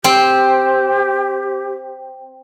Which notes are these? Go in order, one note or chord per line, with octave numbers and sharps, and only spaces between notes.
C4 G4